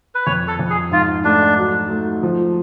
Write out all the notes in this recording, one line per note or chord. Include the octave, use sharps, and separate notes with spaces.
B4
F2 C#5
A4
F2
G#4
G#2 F4
A3 D4
F#3
A3
F3